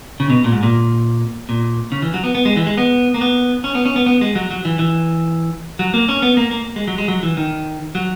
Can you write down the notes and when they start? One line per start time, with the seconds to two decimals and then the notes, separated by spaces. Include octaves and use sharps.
0.20 C#3
0.30 B2
0.44 A#2
0.52 G#2
0.63 A#2
1.49 A#2
1.92 C#3
2.02 E3
2.14 F#3
2.24 B3
2.35 B3
2.45 G#3
2.56 E3
2.67 G#3
2.77 B3
3.14 A#3
3.21 B3
3.64 C#4
3.75 B3
3.86 C#4
3.96 B3
4.06 B3
4.21 G#3
4.35 F#3
4.50 F#3
4.65 E3
4.79 E3
5.79 F#3
5.94 A#3
6.09 C#4
6.22 B3
6.37 A#3
6.51 A#3
6.76 G#3
6.88 F#3
6.98 G#3
7.08 F#3
7.23 E3
7.37 D#3
7.95 F#3